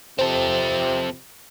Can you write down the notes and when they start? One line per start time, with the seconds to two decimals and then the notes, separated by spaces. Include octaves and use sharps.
0.19 F2 C3 C4 A4 C5